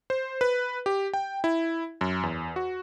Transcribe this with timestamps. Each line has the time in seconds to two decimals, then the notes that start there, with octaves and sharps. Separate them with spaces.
0.10 C5
0.41 B4
0.86 G4
1.14 G5
1.44 E4
2.01 F#2
2.23 E2
2.56 F#4